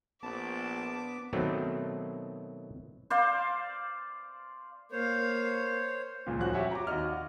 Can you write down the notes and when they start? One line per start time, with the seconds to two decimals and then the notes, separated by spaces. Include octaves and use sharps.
0.23 A#1 B3 A5 D6
1.33 B2 D#3 F#3 A3 C4
3.10 C5 D5 F5
4.92 A#3 C5 C#5 F5
6.27 C#2 A#2
6.39 D#1 F2 F3 C#4 F#4 F#6
6.53 F#4 G4 C#5 E5 F#5 G#5
6.71 A#5 D6
6.87 D#2 F#4 D#5 F6
7.11 F#5